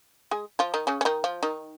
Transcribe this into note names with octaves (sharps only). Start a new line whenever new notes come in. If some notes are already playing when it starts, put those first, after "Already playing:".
G#3 G#4
F3 F4
D#3 D#4
C#3 C#4
C#4
D#3 D#4
F3 F4
D#3 D#4